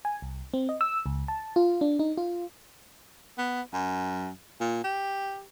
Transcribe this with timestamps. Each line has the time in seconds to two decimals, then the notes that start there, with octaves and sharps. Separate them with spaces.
0.05 G#5
0.22 C2
0.54 C4
0.69 D#5
0.81 E6
1.06 C#2
1.28 A5
1.56 F4
1.81 D4
1.99 D#4
2.17 F4
3.38 B3
3.73 F#2
4.60 A#2
4.84 G4